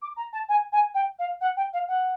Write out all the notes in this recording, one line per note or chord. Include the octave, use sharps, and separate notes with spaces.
D6
A#5
A5
G#5
G#5
G5
F5
F#5
G5
F5
F#5